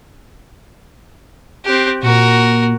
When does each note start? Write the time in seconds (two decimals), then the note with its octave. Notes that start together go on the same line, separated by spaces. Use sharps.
1.65 C4 G4 F#6
2.03 A#2 F#4 A#4